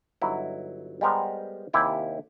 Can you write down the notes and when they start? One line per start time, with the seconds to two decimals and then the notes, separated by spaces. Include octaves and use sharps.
0.22 G1 F#3 D#4 E4
1.01 G3 G#3 B3 A#4 C5
1.73 D#2 C3 E4 G4 G#5